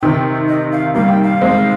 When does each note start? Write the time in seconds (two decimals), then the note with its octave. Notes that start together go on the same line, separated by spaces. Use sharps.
0.02 C3 D#3 G5
0.49 D#5
0.72 F5
0.94 G3 A#3 F5
1.09 G5
1.23 F5
1.41 G#3 C4